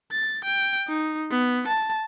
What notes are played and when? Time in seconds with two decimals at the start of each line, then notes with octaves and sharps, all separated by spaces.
0.12 A6
0.45 G5
0.88 D#4
1.31 B3
1.68 A5